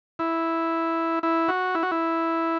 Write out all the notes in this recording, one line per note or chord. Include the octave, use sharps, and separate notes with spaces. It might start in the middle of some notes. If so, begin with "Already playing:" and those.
E4
E4
F#4
E4
F#4
E4